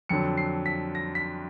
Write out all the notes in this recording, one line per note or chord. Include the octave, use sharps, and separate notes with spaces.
F2 D3 F#3 C#7
C7
B6
A#6
B6